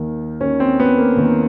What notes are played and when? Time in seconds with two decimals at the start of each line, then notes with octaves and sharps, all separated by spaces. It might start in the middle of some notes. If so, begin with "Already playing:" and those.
Already playing: D#2 D#3
0.40 D#2 D#3 C#4
0.60 C4
0.80 B3
0.98 A#3
1.17 D#2 D#3